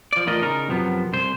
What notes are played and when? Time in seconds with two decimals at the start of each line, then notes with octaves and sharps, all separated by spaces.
0.13 F3 D5
0.26 E2 A2 F4 A#4 D5 D#5
0.41 C#3 D#4 A#4
0.68 F#2 C3 F3 B3
1.13 C2 C5